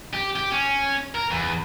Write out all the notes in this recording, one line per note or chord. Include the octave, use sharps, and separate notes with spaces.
G4
G4
C#4
A#4
E2